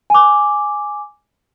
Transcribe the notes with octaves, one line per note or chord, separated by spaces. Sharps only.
G#5 D6